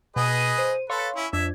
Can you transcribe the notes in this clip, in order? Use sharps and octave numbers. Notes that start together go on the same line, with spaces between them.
B2 G#4 B4 D#5
C5 D#7
A4 B4 C#5 F5 C6
C#4 E4
F2 D4 E5 G#6